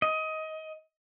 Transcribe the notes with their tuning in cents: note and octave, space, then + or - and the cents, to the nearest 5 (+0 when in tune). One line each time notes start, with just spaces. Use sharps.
D#5 +20